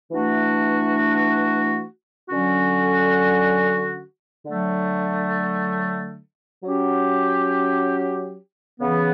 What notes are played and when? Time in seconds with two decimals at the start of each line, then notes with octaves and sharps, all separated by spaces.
0.11 E3 A3 D4 F#4
2.29 D3 F#3 C#4 F#4
4.46 D3 F#3 A3
6.64 F#3 C#4 G4
8.80 C#3 E3 B3